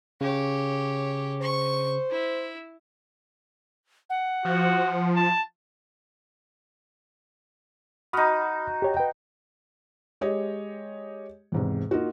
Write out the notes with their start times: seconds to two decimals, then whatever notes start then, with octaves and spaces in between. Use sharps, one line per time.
0.21 C#3 G4 C#5
1.41 C5 C#6
2.10 E4
4.10 F#5
4.45 F3 F#4
5.15 A5
8.13 D#4 F#4 B5 D#6 F6
8.82 G4 C#5 G5
8.97 B4 G5
10.21 G#3 G4 C#5 D#5
11.52 E2 G#2 C3
11.91 A#3 D#4 F4 F#4